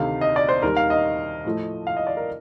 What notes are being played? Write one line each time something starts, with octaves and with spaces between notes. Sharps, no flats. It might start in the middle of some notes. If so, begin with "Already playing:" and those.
Already playing: D2 C3 D#3 A3 F5
D#5
D5
C5
D#2 D#3 G3 A#4
F5
D#5
A2 F3 A3
F5
D#5
D5
A#4